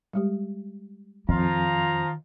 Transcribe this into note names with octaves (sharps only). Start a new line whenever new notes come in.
G3 G#3 G4
F2 D#3 F3 F4 A#5